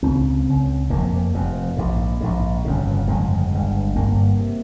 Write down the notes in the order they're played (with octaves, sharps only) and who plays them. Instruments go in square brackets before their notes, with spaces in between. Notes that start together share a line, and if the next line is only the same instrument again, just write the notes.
[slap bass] C#2 C#3 C4
C#2 C#3
F1 F2 C3 A#3
F1 F2 C3
A#1 G#2
A#1 G#2
G1 F2 C#3
G1 F2 C#3 G#3
G1 G2
G1 G2 A#3
C3